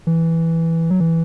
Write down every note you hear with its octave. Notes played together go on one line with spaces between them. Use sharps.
E3
F#3
E3